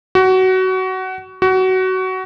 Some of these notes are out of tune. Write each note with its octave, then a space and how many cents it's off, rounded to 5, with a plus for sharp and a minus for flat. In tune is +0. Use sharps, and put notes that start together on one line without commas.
F#4 +20
F#4 +20